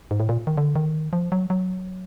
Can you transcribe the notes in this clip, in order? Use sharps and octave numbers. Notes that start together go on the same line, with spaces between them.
G#2
A2
A#2
D#3
D3
D#3
F3
F#3
F#3